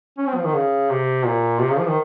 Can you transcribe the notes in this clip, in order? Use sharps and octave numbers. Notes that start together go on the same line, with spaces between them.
C#4
C4
F3
D#3
C#3
C3
A#2
C3
C#3
F3
D#3